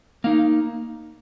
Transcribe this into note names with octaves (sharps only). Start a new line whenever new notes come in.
A#3 D#4 F5